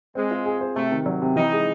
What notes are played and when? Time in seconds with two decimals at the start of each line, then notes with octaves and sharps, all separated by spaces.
0.15 G#3 C4
0.31 F4
0.46 G#4
0.61 C5
0.76 C3 A3
0.92 D#3
1.06 F#3
1.22 C3
1.36 E3 D#4
1.52 G#3